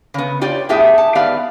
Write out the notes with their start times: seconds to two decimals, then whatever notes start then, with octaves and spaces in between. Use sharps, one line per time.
0.14 C#3 B3
0.41 F4 G4 C#5 D5
0.69 A2 B3 G4 G#4 E5
0.98 A5
1.15 G#2 B3 G4 D5 F5